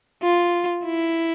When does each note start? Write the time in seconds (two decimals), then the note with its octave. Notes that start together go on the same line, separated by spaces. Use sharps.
0.23 F4
0.86 E4